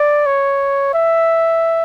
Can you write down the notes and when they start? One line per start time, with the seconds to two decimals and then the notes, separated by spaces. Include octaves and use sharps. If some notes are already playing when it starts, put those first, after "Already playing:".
Already playing: D5
0.26 C#5
0.94 E5